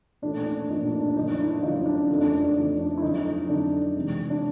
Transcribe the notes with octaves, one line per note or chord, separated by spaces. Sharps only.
A#2 F3 A3 D4
D4
A#2 F3 A3 D#4
D4
D4
F#2 D3 F3 D#4
D4 E4
F#2 D3 F3 D#4 F4
D4
F2 C#3 F3 A3
D4
D#4
D4
F2 C#3 F3 A3
D4
E4
F2 D3 F#3 D#4
D#4
F2 D3 F#3 D4
C3 E3 G#3
D4